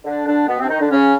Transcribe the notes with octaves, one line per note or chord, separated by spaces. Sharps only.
D3 D4
D3 D4
B2 B3
C3 C4
D4
D#3 D#4
D3 D4
C#3 C#4